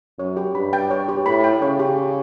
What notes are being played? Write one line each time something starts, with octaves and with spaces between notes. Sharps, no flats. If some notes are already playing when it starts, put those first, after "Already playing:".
F#2 C#5
G4
G2 B5
G5
C#5
G4
A2 B5
G5
C#3 C#5
G4
G4